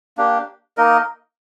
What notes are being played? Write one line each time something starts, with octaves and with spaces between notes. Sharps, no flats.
A#3 D4 G4
A#3 D#4 A#4 D#5